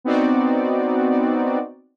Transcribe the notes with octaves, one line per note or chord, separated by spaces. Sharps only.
B3 C4 D#4 F#4 D5